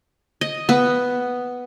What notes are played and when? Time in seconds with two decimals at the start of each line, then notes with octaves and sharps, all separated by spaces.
0.41 D#5
0.69 B3